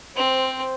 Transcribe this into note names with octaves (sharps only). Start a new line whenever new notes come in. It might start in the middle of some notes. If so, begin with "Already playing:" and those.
C4 C5